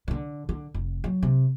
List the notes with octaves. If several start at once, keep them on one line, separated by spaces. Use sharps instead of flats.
D3 E3
D3
F1
F#3
C3